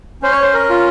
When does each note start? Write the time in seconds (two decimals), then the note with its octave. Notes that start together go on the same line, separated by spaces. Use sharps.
0.22 C#4 C5
0.32 C#5
0.42 C5
0.54 A#4
0.69 F4